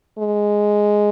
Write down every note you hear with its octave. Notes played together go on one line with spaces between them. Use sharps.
G#3